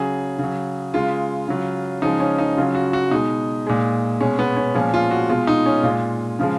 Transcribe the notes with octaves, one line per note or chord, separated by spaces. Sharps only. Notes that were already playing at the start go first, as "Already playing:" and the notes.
Already playing: C#3 F#3 G#4
C#3 F#3
C#3 G#3 F4
C#3 F#3
C#3 F3 G#3 D#4
C#4
D#4
C#3 F#3 F4
F#4
F#4
B2 G#3 D#4
A#2 G#3
B2 G#3 C#4
B3
C#4
A#2 F3 G#3 C#4
F4
F#4
B2 G#3 F4
D#4
C#4
A#2 G#3 F4
C#3 F3 G#3